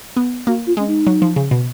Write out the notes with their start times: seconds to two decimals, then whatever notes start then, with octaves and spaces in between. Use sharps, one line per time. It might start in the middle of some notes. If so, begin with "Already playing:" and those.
0.16 B3
0.47 A#3 F#4
0.66 F4
0.77 G#3 C#4
0.87 D#4
1.07 F#3
1.22 F3
1.36 C#3
1.51 B2